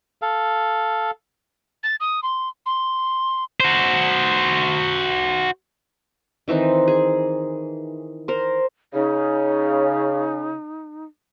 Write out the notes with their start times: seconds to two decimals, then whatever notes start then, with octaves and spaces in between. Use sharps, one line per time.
0.22 A4 F5
1.83 A6
2.00 D#6
2.23 C6
2.66 C6
3.60 F#4 C5
6.48 D#3 E3 C4 D#4
6.88 G#4
8.28 A#4 C5
8.94 C#3 D#4